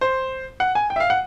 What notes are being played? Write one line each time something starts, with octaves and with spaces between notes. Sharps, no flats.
C5
F#5
G#5
G5
E5
F5
F#5